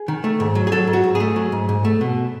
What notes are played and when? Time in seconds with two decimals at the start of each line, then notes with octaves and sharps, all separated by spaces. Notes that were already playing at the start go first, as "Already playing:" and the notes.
Already playing: G#4
0.08 D#3
0.24 A3
0.40 G#2
0.55 F#3
0.67 G#4
0.72 F#3 A4
0.87 G#2
0.93 F#4
1.04 G#2
1.15 G#4
1.20 A3
1.36 F#3
1.52 G#2
1.69 G#2
1.85 A3
2.01 B2